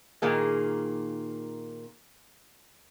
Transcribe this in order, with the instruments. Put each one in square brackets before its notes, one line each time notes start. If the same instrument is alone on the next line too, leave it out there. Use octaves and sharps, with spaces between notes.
[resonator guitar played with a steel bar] A#2 D#3 A#3 G#4